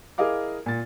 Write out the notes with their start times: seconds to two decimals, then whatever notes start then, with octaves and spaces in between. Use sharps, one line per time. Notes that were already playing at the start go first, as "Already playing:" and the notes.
0.18 E4 G#4 A#4 D#5 F5 D6
0.66 A#2 A6